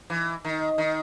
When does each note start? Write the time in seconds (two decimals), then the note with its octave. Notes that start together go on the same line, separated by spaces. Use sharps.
0.10 E3
0.45 D#3
0.78 D#3